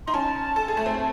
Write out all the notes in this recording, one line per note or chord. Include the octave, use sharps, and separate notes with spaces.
D#4 C6
C#4 A5
A4
G#4
A3
C4